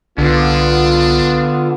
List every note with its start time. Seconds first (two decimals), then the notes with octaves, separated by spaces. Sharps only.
0.18 C2 D3 B3 D4 F4